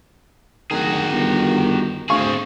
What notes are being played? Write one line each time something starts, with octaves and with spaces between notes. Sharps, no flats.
D1 D#3 F#4 G#4
G1
D2 C4 G#4 F5 C#6